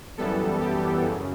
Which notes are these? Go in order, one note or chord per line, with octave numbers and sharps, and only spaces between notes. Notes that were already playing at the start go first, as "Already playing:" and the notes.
F#2 E3 G3 B3 A4
G4
F#2 C#3